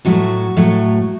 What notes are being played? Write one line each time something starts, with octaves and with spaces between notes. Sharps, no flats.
A2 F#3 A3 F#4
A2 F#3 A3